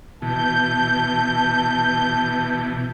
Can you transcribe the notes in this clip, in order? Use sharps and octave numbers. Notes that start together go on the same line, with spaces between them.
B2 E3 A5 G6